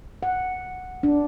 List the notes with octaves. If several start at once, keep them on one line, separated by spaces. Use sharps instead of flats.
F#5
D4